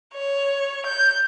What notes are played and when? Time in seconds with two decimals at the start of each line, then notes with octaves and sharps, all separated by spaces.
0.14 C#5
0.86 G6